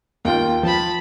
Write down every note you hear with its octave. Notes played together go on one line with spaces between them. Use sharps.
D#2 F4 G5
F3 A5 B5